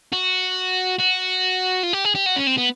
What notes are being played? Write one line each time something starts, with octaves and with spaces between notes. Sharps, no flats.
F#4
F#4
F4
G4
G#4
G4
F#4
C#4
C4
B3